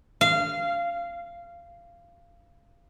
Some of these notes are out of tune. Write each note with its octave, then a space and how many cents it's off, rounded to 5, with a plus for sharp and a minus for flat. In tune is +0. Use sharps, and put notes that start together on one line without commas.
F5 -20